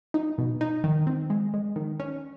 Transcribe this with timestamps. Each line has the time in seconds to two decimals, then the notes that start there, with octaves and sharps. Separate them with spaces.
0.14 D#4
0.38 B2
0.61 D#4
0.84 D#3
1.07 C4
1.30 G#3
1.54 G#3
1.76 D#3
2.00 C#4